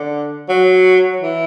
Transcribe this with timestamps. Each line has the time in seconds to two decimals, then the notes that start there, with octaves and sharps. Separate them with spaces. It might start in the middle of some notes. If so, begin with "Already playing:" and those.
Already playing: D3
0.49 F#3
1.21 E3